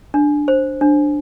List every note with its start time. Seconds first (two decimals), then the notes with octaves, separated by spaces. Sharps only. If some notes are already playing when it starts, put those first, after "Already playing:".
0.14 D4
0.48 C5
0.81 D4